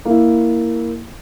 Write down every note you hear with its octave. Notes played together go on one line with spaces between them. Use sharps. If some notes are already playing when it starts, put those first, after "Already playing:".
A#3 E4